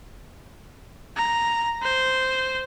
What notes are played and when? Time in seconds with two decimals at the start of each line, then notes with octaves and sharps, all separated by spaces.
1.17 A#5
1.83 C5